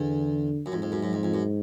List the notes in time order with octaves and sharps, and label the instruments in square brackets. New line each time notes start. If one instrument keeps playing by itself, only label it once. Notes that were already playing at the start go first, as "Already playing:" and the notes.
Already playing: [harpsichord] E2 [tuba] D3
[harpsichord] F#2
[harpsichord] F2 [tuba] G#2
[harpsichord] F2
F#2
F#2
F2
F2
F#2